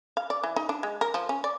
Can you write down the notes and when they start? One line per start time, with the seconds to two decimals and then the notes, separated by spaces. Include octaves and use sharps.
0.17 F5
0.30 D5
0.44 E3
0.56 D#4
0.69 D4
0.83 G#3
1.01 A#4
1.14 F3
1.29 C#4
1.44 D5